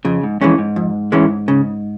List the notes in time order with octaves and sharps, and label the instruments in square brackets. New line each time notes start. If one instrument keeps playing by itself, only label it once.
[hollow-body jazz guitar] F2 [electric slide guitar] C#3
[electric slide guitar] G#2
[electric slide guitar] F2 [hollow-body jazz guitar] E3 G#3 C#4
[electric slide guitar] G#2
[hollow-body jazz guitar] F2
E3 G#3 C#4
C#3